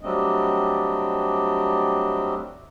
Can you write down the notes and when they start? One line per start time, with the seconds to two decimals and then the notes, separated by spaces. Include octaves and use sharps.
0.01 F#3 G3 A3 C4 D4 D#5